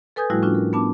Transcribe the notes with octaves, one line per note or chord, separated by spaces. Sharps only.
A4 B4 G#5 D#6 G6 G#6
A2 F3 G3 A3 E4 F#4
C#4 D4 F4 F#4
A#4
B3 D4 A5 D6